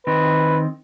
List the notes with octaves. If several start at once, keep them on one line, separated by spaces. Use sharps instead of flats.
D#3 C4 B4